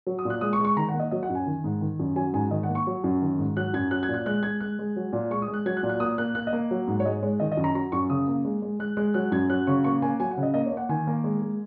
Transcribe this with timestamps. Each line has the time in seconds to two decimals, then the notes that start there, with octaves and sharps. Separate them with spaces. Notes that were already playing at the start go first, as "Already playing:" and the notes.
0.07 F#3
0.19 D#6
0.25 A#2
0.30 F#6
0.41 G#3 D#6
0.53 C#6
0.60 G#3
0.65 C#6
0.76 D#3 A#5
0.89 F#5
0.94 A#3
0.99 D#5
1.11 F#3 D#5
1.23 F#5
1.29 F#2
1.35 G#5
1.47 D#3
1.64 G#2
1.81 D#3
1.99 F#2
2.16 F#3 G#5
2.33 G#2 G#5
2.51 D#3 D#5
2.63 F#5
2.69 A#3
2.75 C#6
2.87 F#3
3.04 F#2
3.22 D#3
3.39 G#2
3.57 F#3 F#6
3.73 F#2 G#6
3.91 F#3 F#6
4.03 G#6
4.09 A#2
4.14 F#6
4.26 G#3 F#6
4.43 G#3 G#6
4.60 G#3 F#6
4.79 G#3
4.96 F#3
5.13 A#2
5.31 G#3 C#6
5.42 D#6
5.48 G#3
5.54 F#6
5.66 F#3 G#6
5.77 F#6
5.83 A#2
5.89 F#6
6.00 A#3 D#6
6.18 A#3 F#6
6.35 A#3 F#6
6.47 D#5
6.53 A#3
6.71 F#3
6.88 G#2
7.00 C#5
7.05 G#3 D#5
7.22 G#3 C#5
7.40 D#3 D#5
7.52 D#5
7.57 F#2
7.64 A#5
7.75 F#3 A#5
7.92 F#2 C#6
8.10 C#3 D#6
8.28 A#3
8.45 G#3
8.62 G#3
8.79 G#3 F#6
8.97 G#3 F#6
9.14 F#3 F#6
9.32 F#2 G#6
9.49 F#3 F#6
9.67 C#3 C#6
9.84 A#3 C#6
10.02 A#3 G#5
10.20 F#3 G#5
10.31 F#5
10.37 C#3
10.43 D#5
10.54 A#3 D#5
10.66 C#5
10.72 A#3 F#5
10.89 D#3 G#5
11.07 A#3
11.24 G#3
11.42 G#3